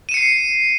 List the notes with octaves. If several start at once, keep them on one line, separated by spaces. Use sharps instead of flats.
C7 C#7 D#7 E7